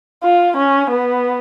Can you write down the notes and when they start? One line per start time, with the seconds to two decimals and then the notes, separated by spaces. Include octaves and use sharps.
0.23 F4
0.57 C#4
0.91 B3